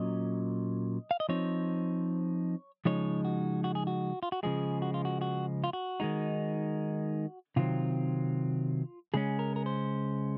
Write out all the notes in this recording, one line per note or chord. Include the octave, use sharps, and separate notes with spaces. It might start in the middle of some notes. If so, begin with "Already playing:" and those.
Already playing: A#2 F#3 C#4 D#5
F5
D#5
F3 C4 D#4 C#5
C#3 F3 G#3 D#4 C#5
F#4
F#4
G#4
F#4
F4
F#4
C#3 F3 G#3 G#4
F#4
F4
F#4
F#4
F4
F#4
D#3 G#3 D#4
C3 D#3 F#3 C4 F4
C#3 G#3 C#4 G#4
A#4
A#4
C5